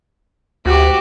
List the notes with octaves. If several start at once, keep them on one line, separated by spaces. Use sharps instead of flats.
D2 F#4 G4